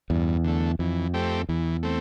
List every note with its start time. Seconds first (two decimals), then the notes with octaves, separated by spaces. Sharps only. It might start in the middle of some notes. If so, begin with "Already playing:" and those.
0.10 E2 G2
0.44 D3 A3
0.79 F2 E3
1.14 A3 C4 G4
1.49 E2 E3
1.83 A3 C4